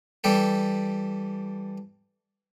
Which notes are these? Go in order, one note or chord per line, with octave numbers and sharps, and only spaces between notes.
E3 G3 G4 A4